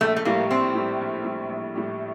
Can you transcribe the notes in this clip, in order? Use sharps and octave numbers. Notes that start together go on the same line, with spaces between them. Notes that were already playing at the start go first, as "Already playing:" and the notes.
A#1 A3
A3
A2 G3 A#3
A#1 C4
A2 G3
A#1
A2 G3
A#1
A2 G3